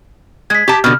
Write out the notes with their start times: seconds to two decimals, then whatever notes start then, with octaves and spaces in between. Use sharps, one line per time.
0.50 G#3 G#6 B6
0.68 G4 A5
0.84 B2 D3 F6